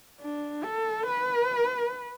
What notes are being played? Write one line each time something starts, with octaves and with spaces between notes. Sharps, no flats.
D4
A4
B4